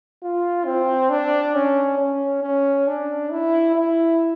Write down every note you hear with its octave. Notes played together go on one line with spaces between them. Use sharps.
F4
C4
D4
C#4
C#4
C#4
D4
E4
E4